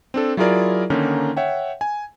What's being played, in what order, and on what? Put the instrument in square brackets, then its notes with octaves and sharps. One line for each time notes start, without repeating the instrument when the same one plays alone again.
[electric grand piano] C4 D4 A4
F#3 E4 F4 G#4 A#4 D5
D3 D#3 A#3 C#4 D#4
C#5 E5 F#5 G5
G#5